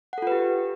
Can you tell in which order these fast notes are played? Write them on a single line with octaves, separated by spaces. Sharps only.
F#5 A4 F4 B4 G4